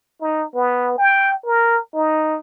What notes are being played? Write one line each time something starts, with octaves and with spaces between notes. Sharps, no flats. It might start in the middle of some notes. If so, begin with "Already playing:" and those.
D#4
B3
G5
A#4
D#4